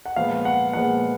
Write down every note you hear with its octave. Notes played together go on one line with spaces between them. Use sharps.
F#5
A#2 F3 G#3 B3 F5
F#5
A#2 F3 G#3 B3 F#5